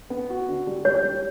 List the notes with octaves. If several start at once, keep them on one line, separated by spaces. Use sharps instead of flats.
B3
F#4
D3
G3
G3 C#5
G3